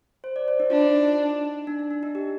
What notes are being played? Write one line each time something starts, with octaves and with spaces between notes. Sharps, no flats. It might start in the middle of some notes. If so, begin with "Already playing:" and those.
C5
D5
C5
D#4
D4 F4
D#4
D4
D4
D4
D#4
G4